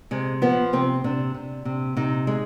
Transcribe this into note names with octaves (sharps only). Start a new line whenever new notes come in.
C3 G#3
F3 B3
C3 C4
C3 D4
C3
C3
C3 D#4
G#3